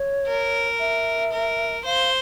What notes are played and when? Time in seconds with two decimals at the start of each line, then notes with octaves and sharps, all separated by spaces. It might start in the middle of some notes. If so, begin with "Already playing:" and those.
Already playing: C#5
0.27 A#4
0.80 E5
1.32 A#4
1.85 C5 F5